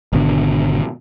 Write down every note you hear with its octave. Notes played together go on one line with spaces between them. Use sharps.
G#1 B2 D3